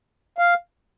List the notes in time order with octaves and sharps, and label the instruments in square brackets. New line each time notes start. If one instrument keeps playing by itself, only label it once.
[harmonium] F5